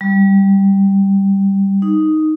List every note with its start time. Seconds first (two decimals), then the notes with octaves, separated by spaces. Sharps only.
0.01 G3
1.82 D#4